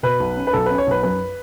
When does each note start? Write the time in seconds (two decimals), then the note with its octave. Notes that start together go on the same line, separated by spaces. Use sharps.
0.03 B2 B4
0.20 B1
0.37 C#4
0.47 B4
0.53 B1 A4
0.66 C#4 B4
0.78 C#5
0.87 B1 B4
1.03 F#2 B4